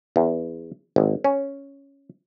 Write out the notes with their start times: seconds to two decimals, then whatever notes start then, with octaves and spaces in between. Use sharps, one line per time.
0.16 E2
0.96 G#1
1.24 C#4